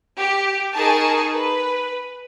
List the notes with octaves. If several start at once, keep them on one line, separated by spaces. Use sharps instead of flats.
G4
D#4 G#4 A#4 A5 C#6
B4